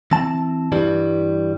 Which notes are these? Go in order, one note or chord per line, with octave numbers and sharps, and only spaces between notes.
E3 C4 A5
G2 E3 G3